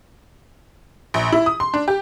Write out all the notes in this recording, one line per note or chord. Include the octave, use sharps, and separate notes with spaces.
A#1
E4
D#6
C6
D4
G4